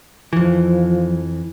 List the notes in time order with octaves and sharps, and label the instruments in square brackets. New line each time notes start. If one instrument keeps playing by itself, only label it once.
[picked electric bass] F2 E3 [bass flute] F3